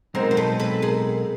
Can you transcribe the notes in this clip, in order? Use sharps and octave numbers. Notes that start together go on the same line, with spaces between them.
B1 B2 G#3 C4 D#4 A#4 C5
C5
A4 B4
A4 B4
G#4 A#4